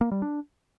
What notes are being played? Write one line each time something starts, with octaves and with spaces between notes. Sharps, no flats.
A#3
G3
D4